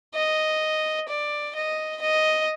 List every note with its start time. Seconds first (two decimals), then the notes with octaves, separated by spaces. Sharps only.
0.15 D#5
1.09 D5
1.55 D#5
2.02 D#5